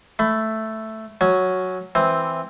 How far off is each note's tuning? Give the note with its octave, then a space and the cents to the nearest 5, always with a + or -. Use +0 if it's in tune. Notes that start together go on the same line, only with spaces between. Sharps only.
A3 +0 B5 +20
F#3 +0 C#4 +0
E3 +0 C4 +0